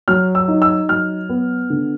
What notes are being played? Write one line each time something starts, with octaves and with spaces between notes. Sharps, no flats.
F#3 F6
E6
D#4
E6
F#3 F6
B3
D3